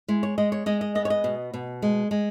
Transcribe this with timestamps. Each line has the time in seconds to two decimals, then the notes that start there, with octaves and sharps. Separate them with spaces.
0.08 G#3 E4
0.23 C#5
0.38 G#3 D#5
0.52 C#5
0.66 G#3 D#5
0.81 D#5
0.95 B3 D#5
1.05 C#5
1.10 D#5
1.24 B2
1.54 B2
1.82 G#3
2.11 G#3